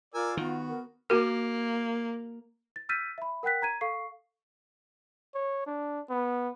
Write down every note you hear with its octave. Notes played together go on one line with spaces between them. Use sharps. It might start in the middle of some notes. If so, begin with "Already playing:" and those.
F4 A#4 D5 G#5 E6
D#3 B3 F#4
A#4
A#3 F#4 A#4
A6
E6 F6 G6 A6 B6 D#7
E5 B5
A#4 F#5 G5 F#6 B6
A#5 G#6 D#7
A4 F5 C#6 C7
C#5
D4
B3